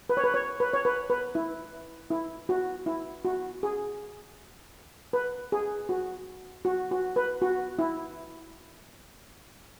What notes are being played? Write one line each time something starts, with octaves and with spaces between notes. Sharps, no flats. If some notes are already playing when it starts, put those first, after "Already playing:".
B4
C#5
B4
C#5
B4
C#5
B4
B4
E4
E4
F#4
E4
F#4
G#4
B4
G#4
F#4
F#4
F#4
B4
F#4
E4